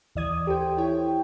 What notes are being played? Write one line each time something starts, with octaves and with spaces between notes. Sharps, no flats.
D#2 E3 D5 D#6 G#6
G4 A4 C5 G5
E4 C#5 G5